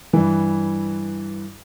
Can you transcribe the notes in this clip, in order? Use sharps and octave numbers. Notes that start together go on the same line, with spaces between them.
G2 E3